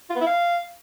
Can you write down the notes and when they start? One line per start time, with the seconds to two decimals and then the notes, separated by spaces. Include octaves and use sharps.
0.10 F4
0.15 B3
0.21 E4
0.26 F5